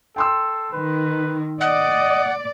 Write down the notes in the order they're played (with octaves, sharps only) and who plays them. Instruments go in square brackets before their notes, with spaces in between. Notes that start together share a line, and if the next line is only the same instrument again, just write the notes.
[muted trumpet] A4 [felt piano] G5 C6 E6
[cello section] D#3 [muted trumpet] B4
[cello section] D5 [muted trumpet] D#5 [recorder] F#5